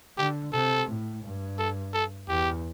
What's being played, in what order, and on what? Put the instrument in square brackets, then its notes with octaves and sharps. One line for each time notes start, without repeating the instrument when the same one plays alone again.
[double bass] D3 [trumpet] G4
[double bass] C3 [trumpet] A4
[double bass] A2
G2
[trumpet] A4
A4
[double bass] E2 [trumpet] G4